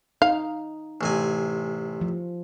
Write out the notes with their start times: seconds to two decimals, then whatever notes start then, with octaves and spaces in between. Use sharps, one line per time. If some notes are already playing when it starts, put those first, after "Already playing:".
0.22 D#4 F5
1.01 A1 C3 G#5
2.01 F3